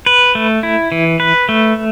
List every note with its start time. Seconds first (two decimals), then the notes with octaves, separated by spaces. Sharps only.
0.06 B4
0.35 A3
0.63 E4
0.92 E3
1.20 B4
1.49 A3